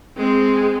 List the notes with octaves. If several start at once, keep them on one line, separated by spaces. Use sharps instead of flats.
G#3 C4